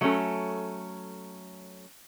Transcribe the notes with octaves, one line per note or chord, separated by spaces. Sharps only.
F#3 A3 C#4 A4